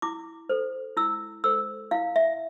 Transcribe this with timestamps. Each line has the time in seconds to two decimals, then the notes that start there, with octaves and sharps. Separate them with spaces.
0.02 E4 D6
0.49 A4 C5
0.97 E4 E6
1.44 A4 C5 E6
1.91 E4 F5
2.16 E5